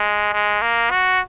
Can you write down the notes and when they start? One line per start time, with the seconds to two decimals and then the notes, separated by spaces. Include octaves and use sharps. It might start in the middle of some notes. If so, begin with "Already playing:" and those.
Already playing: G#3
0.33 G#3
0.62 A#3
0.91 F#4